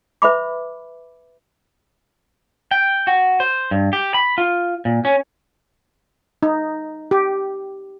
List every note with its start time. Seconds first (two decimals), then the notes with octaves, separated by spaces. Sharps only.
0.22 B4 E5 B5 D6
2.71 G5
3.07 F#4
3.40 C5
3.71 G2
3.93 G4
4.14 B5
4.38 F4
4.85 A#2
5.05 C#4
6.43 D#4
7.11 G4